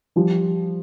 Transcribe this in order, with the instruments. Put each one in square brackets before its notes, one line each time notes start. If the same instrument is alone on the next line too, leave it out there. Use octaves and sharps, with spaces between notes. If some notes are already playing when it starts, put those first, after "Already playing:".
[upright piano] F3 G3